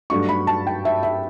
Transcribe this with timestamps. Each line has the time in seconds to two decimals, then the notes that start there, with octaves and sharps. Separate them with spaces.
0.10 G2 F#3 A3 D4 C#6
0.29 B5
0.47 A5
0.67 G5
0.85 E5
1.03 E5